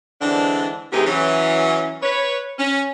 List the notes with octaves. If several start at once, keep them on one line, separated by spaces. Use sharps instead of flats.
D3 E3 G#3 C4 D4
A2 C3 E3 D#4 G4 G#4
E3 F#3 C#4
B4 C#5
C#4